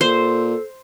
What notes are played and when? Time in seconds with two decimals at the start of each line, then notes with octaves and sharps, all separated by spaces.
0.01 A#2 A4 C5